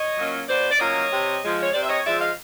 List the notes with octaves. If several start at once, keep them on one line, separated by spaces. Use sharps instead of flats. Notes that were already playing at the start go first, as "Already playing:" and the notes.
Already playing: C#5 D#5
F#3 A#3 C#4 F4
B2 C5 D5
D5
F#3 A#3 C#4 F4 C#5 D#5
C3
F3 G#3
C#5
C3 C5 D5
E5
C#5 D#5
F3 G#3 D5 E5
D#5 F5